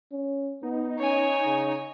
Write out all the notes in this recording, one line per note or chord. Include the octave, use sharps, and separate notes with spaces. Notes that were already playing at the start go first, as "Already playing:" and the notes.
C#4
B3 D#4
C#4 C#5 G#5
C#3